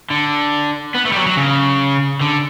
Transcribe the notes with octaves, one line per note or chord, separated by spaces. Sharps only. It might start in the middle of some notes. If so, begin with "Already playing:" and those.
D3
B3
A3
G3
F#3
F#3
C#3
D3